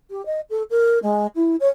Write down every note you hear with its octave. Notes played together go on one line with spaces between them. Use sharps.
G4
D#5
A4
A#4
G#3
E4
C#5